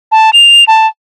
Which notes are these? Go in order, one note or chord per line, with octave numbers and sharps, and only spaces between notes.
A5
F7
A5